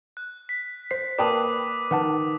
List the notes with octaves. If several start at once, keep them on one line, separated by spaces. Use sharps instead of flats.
F#6
B6
C5 C7
A#3 B4 D5 G5 A5 D6 D#6 D#7
D#3 B4 F#5 A5